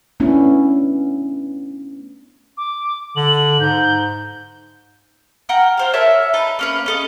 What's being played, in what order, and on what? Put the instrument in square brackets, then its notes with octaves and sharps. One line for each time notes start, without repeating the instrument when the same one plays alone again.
[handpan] A3 B3 C#4 D4 E4
[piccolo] D6
[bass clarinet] D3 [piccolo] F#7
[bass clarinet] G#2 [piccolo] G6
[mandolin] F#5 G5 A#5 F6
F4 C5 F5
A#4 C#5 E5 A5
D#4 B4 A5
A#3 C#4 B4
C#4 A4 D#5